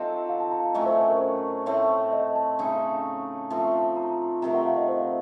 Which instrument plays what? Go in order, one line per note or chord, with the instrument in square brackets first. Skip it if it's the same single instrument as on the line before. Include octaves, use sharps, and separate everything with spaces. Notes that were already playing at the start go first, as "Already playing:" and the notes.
Already playing: [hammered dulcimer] F#3 C4 D#4 F4 A4 [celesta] D#5
[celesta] F5
A5
A#5
A5
[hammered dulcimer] A2 F#3 A3 C#4 [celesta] D#5
[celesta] C5
C5
A#4
C5
[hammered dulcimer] A2 A3 C4 [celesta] C#5
[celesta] D#5
A5
[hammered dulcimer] C#3 A3 D#4
[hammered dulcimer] F3 A3 C4 F4 [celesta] A5
[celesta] A#5
[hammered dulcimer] C3 D#3 A3 C4 [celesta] A#5
[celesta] F#5
F5
D#5
C5